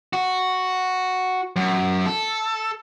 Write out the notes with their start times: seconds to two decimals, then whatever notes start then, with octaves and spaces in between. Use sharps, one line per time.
0.13 F#4
1.56 F#2
2.06 A4